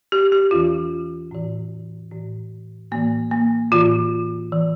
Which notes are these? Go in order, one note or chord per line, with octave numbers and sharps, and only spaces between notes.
G4
G4
E2 E3 F4
A2 E3
A2 E3
A2 E3 A#3
A#3
A2 E3 F4
E3